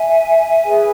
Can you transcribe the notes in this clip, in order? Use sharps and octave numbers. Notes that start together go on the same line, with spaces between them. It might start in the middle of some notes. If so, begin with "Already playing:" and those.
Already playing: E5 G#5
E4 G#4 B4